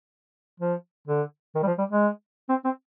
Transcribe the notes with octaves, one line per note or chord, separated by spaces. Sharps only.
F3
D3
D#3
G3
F3
G3
G#3
C4
C4